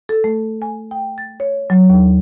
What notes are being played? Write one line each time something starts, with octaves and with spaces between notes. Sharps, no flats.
A4
A3
G#5
G5
A6
C#5
F#3
D#2